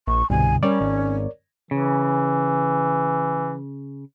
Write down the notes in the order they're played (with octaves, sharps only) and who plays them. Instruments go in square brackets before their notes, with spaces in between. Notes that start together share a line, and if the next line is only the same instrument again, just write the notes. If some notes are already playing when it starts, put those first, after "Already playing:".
[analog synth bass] A#1 [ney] C#6
[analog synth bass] C2 [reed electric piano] G2 B2 D3 [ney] G#5
[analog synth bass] G3 [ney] C#4 [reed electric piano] A#4 C#5 D5
[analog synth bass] G#1
[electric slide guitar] C#3 [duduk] E3